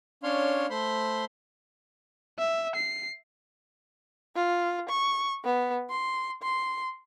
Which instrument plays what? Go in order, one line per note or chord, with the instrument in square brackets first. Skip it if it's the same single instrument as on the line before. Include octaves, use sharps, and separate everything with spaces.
[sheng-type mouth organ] C#4 D4 C#5 F5 C6
A3 C5 B5 C6
[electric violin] E5
C7
[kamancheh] F4
C#6
B3
C6
C6